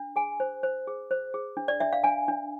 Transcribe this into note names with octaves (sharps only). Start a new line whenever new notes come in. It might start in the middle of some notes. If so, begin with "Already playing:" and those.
Already playing: D4
G#4 G#5
C5
C5
G#4
C5
G#4
D4
D5
D4 E5
F5
D4 G#5
D4